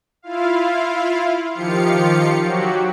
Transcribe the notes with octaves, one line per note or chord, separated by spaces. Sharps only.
E4 F4 F5
D#3 F3 F4 G4 F5 C#7
F#3 F#4 G4